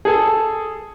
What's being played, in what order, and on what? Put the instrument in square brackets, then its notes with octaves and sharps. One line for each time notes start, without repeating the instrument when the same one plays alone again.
[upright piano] G#4 A4